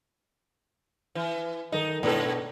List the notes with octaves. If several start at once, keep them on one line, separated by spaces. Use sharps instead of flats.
E3
D#3 D#4 A4 D#5
G#2 B2 D4 A4 A#4